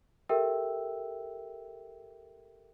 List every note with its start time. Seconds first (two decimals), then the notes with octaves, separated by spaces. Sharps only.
0.29 G4 A4 A#4 E5 G5 E6